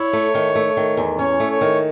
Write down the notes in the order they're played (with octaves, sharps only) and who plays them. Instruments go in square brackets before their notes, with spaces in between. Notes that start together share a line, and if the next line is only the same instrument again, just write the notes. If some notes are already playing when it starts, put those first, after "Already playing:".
Already playing: [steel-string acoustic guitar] E4 [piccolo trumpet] C#5
[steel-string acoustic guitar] A3
D#3
A3
D#3
E2
[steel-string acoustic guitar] C#4 [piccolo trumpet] C#5
[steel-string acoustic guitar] A3
[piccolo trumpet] C#5
[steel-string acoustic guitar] D#3